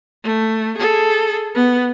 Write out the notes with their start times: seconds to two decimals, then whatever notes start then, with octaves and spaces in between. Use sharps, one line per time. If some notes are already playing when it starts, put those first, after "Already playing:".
0.24 A3
0.78 G#4 A4
1.55 B3